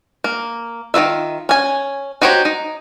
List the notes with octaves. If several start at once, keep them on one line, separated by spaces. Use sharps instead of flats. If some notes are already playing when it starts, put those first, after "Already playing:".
A#3
D#3 F#3 F4 E5
C#4 G#5
D#4 F#4 G4 C5 C#5
D#4